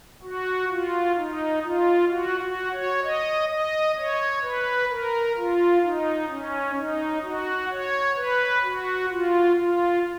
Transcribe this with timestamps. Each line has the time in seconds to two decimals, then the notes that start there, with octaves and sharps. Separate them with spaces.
0.23 F#4
0.70 F4
1.17 D#4
1.63 F4
2.10 F#4
2.40 F#4
2.72 C#5
3.03 D#5
3.49 D#5
3.97 C#5
4.43 B4
4.90 A#4
5.36 F4
5.83 D#4
6.29 C#4
6.77 D#4
7.23 F#4
7.70 C#5
8.17 B4
8.64 F#4
9.10 F4
9.57 F4